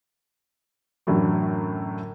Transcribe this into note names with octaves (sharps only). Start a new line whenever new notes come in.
F#2 A2 D3 E3 F#3